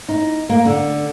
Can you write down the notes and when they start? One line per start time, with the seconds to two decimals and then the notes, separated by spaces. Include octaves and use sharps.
0.08 D#4
0.49 A#3
0.65 D3